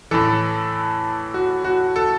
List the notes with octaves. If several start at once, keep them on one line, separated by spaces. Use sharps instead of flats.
A2 E3 A4
F#4
F#4
A4